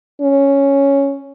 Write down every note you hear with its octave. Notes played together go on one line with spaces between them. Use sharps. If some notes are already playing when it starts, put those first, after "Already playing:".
C#4